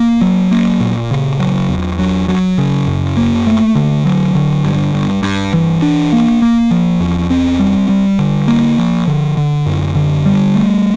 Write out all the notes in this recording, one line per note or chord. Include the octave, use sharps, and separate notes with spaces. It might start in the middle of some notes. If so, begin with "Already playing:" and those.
Already playing: A#3
F#3
A#3
A#2
C#3
F#3
E2
F#3
F#3
C#3
F#2
A#3
A3
D3
F#3
D3
G2
G2
G2
E3
D4
A#3
A#3
F3
E2
C4
G3
G3
D3
A#3
F3
D3
D3
F#2
D3
G3
A3